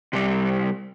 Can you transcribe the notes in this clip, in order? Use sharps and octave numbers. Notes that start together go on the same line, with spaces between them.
C3 G3